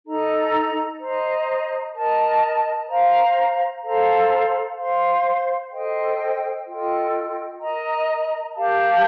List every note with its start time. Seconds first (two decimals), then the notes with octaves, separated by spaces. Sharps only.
0.07 D#4 A4 D#5 A#5
1.01 C5 D#5 A#5
1.95 A#4 D#5 A5
2.89 C5 F5 A#5
3.84 A4 C5 F5 A#5
4.78 C5 F5 C6
5.72 A4 C5 D#5 G5
6.66 F4 A4 D#5 G5
7.61 A#4 D#5 A#5
8.54 G4 A#4 F5 A5